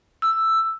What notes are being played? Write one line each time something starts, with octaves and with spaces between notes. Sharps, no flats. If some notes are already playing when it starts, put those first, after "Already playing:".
E6